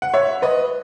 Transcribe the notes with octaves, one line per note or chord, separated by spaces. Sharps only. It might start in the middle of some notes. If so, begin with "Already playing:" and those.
F#5
C#5 E5
B4 D#5